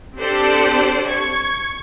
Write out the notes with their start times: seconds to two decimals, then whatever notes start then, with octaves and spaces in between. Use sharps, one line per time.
0.17 C4 D4 G4 A4 C5 D5
1.08 C#6 G#6